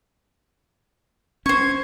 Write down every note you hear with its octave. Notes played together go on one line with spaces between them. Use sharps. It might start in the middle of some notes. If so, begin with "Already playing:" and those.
C#4 C5 C#6 G#6